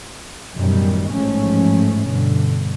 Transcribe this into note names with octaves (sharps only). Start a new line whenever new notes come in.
A1 F#2 B2 D#3 G3
A1 G#2 F3 A3 C#4
G2 B2 D3